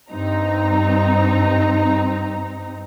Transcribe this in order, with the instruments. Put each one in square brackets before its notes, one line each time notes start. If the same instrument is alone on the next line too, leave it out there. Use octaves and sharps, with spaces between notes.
[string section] G2 C4 D#4 A#5